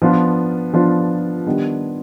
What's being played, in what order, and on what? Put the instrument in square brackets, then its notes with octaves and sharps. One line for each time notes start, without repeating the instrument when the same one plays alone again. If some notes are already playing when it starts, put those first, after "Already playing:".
[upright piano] F3 B3 D4 F4
F3 B3 D4 F4
D#3 G3 B3 D4